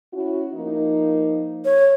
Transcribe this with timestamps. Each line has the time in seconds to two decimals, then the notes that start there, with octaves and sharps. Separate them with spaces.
0.11 C#4 E4 F#4
0.53 F3 A#3 D#4
1.65 C#5